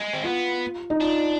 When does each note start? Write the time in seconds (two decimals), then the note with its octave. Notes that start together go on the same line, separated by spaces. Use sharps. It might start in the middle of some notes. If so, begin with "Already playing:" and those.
Already playing: G#3
0.13 C4
0.24 B3 F4
0.90 D#4
1.01 D4 F4